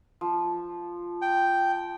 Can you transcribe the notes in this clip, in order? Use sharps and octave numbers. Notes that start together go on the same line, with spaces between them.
F3
G5